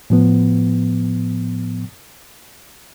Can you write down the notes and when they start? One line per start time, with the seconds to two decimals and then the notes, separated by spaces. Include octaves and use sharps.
0.10 A2 F3 B3